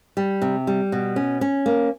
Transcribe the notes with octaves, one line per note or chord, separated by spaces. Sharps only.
G3
C3
G3
B2
C#4
C#4
A#3